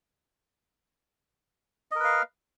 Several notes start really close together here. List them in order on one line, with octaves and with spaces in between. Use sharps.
D#5 A#4 B4 F5